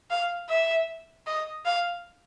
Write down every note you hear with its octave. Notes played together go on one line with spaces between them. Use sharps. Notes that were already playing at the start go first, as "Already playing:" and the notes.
F5
E5
D#5
F5